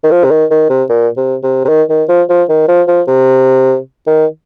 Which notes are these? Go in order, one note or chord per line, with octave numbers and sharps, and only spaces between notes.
D#3
F3
C3
D#3
D#3
C3
A#2
C3
C3
C3
D#3
D#3
F3
F3
D#3
F3
F3
C3
D#3